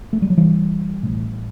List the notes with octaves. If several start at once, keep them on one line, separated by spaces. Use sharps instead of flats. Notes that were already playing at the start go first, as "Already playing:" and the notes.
A3
G3
F#3
E3 G3
A1 A2